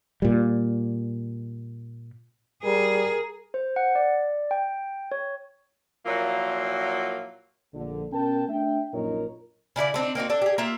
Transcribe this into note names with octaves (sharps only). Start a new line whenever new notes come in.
A#2 G3
G3 G#4 A#4
C5
F#5
D5
G5
C#5
A#2 F3 F#3 A#3 E4 F#4
A#1 D3
B2 C#4 A#4 G5 A5
A3 D4 E5 G5
A#1 F#2 A#2 D#4 A#4 C#5
C#3 D4 E4 D5
A3 C4 D4 D#4
A#3 C4 D#4 F#4
D4 A4
G4 G#4
A#3 F4 E5